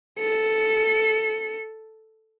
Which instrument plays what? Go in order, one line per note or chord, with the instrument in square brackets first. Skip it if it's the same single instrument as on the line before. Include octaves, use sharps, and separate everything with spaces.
[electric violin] A4 C#7